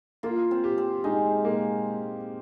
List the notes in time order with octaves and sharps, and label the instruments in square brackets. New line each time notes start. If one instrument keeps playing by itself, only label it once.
[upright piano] A#3 [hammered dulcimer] F4
[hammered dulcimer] C4
[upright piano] G4
[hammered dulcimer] C4
[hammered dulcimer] G#3 [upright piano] D#4
[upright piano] A#3